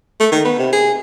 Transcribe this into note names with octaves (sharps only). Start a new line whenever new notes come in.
A3
D#3
B3
C3
G#4